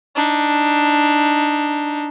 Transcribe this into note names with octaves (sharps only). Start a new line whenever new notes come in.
D4 D#4